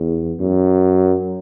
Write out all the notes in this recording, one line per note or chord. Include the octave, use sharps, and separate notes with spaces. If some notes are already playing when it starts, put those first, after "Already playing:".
Already playing: E2
F#2